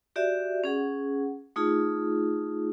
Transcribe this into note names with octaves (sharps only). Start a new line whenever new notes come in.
F#4 G4 D5 E5
C#4 G#4 F#5
A3 D#4 F4 G#4